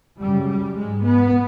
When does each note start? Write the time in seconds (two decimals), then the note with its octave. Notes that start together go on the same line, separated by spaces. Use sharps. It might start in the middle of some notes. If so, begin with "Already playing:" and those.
0.19 F#2 C#3 G3
0.47 G3
0.76 G#2 G#3
1.04 B3